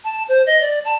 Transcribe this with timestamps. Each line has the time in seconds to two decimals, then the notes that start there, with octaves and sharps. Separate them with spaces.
0.04 A5
0.28 C5
0.46 D#5
0.61 D5
0.85 A5